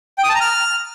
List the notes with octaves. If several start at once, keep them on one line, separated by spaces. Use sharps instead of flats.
G5
D#6
A5
A#5
F6